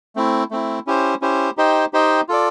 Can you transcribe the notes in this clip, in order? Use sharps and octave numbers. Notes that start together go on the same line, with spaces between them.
A3 C4 E4
A3 C4 E4
C#4 E4 G4 C5
C#4 E4 G4 C5
D#4 G4 C5 D#5 G5
D#4 G4 C5 D#5 G5
F4 A4 D5